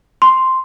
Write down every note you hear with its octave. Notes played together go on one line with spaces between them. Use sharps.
C6